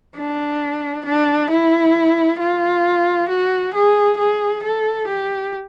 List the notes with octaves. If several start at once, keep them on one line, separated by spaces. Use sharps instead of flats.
D4
D4
E4
F4
F#4
G#4
G#4
A4
G4